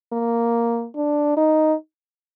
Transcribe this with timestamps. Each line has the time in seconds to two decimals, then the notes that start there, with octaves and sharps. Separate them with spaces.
0.13 A#3
0.96 D4
1.37 D#4